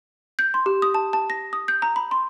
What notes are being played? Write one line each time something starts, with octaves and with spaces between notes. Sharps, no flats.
G6
C6
G4
D#6
A5
A5
A#6
D#6
G6
A#5
B5
C6